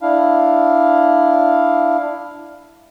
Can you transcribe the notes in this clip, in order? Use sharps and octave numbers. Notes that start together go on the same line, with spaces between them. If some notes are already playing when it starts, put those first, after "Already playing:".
D4 E4 F5